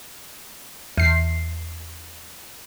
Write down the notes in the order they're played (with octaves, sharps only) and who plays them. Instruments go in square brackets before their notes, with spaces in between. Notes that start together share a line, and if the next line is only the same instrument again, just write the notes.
[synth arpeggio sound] E2 C7